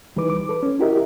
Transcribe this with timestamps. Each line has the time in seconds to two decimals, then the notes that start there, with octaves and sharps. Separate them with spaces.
0.16 C2 E3 G3 D#4 B4 D6
0.30 D6
0.49 A4 B4
0.63 C#4
0.79 E4 F#4 G4 A#4 D#5 E5